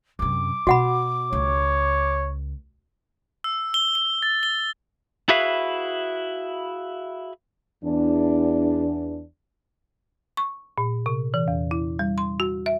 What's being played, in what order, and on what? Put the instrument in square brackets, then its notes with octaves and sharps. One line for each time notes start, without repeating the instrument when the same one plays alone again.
[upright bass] F#2 C3 [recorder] D6
[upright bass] B2 [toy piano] F#4 F#5 B5
[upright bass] C#2 [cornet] C#5
[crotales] E6
G7
G7
A6
G7
[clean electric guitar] E4 F#4 G#4 B4 E5 F5
[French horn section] E2 D4
[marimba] C#6
A#2
C3
E3
E2
E4
G3
C6
F#4
E5